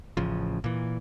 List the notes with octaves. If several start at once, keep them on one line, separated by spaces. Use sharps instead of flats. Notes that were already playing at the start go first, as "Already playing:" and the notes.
A1 A2 C#3 F3
A#2 E3